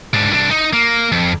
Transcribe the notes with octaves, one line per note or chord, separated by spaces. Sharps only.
G#2 D4
C2 D4
D#4
A#3
F2